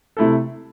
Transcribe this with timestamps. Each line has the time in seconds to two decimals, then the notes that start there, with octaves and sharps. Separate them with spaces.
0.17 C3 A3 E4 A4